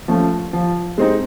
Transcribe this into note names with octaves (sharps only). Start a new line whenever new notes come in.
F3 A3 C#4
F3
G#3 C4 D#4